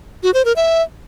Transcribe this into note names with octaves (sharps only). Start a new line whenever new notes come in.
F#4
C5
A#4
E5